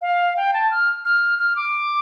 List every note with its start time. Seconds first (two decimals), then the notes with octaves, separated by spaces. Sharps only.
0.02 F5
0.37 G5
0.54 A5
0.71 F6
1.05 F6
1.39 F6
1.56 D6